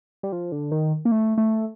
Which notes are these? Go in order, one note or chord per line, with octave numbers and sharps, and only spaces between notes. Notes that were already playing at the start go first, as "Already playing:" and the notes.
G3
F3
D3
D#3
A#3
A3
A3